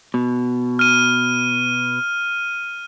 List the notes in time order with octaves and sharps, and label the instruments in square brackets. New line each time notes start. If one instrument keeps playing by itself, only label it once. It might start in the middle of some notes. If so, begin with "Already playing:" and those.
[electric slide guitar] B2
[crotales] F6 D#7